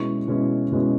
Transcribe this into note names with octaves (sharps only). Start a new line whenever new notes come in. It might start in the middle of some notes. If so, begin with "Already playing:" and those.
Already playing: B2 G#3 C#4 E4 C#6
B2 G#3 C#4 E4
B2 G#3 C#4 E4